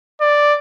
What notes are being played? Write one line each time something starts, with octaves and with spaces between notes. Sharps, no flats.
D5